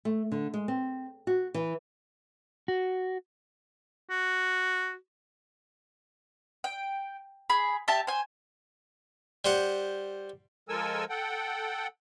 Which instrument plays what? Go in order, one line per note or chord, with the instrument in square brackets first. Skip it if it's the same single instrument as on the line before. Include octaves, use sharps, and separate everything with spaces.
[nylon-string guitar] A3
D3
G#3
C4
F#4
E3
[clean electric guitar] F#4
[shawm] F#4
[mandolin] G5
G#4 B5
G4 E5 A5
C5 G#5
[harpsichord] G3 C5 F#5
[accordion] F3 G#3 A4 A#4 G#5 E6
A4 F#5 G5